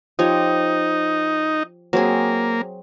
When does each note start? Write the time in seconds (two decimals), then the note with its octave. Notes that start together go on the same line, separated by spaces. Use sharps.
0.19 F3 D#4 G4 C#5
1.93 F#3 A#3 C4 G#4